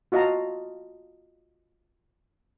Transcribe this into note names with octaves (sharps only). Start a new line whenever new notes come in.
F4 F#4 D#5 F5 A5 A#5